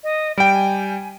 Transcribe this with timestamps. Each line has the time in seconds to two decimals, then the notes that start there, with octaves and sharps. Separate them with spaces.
0.04 D#5
0.38 G3 G5 D7
0.54 G#5